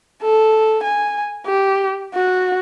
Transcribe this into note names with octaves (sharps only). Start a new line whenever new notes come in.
A4
G#5
G4
F#4